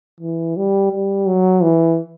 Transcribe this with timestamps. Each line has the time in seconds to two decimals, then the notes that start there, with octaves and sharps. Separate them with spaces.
0.20 E3
0.56 G3
0.92 G3
1.27 F#3
1.63 E3